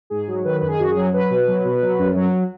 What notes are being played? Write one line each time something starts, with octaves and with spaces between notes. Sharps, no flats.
G#2 G#4
F#3
D#3 B4
F#2 B4
G#4
F#2 F#4
G#4
F#3
F#3 B4
B2
F#3
B2
F#3
F#2
F#3